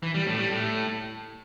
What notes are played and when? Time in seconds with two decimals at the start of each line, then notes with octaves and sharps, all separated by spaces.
0.03 E3
0.14 G3
0.26 A2
0.38 G3
0.50 A2